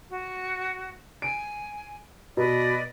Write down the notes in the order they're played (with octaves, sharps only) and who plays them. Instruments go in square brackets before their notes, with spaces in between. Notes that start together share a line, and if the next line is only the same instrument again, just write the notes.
[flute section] F#4
[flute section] G#5 [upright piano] D7
[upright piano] B2 [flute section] B4 D5 D#5